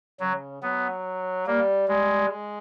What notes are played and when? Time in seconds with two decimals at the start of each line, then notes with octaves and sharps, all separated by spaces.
0.20 C#3 F#3
0.62 F#3 B3
1.47 G3 A#3
1.88 G3 G#3
2.30 G#3